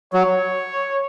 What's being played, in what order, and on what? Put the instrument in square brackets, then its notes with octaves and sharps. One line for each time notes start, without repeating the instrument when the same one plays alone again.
[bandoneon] F#3 [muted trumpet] C#5